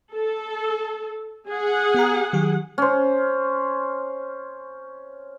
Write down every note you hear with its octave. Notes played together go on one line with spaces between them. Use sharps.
A4
G#4 F#5
B3 G4 A#5
D#3 F#3 G4
C#4 C5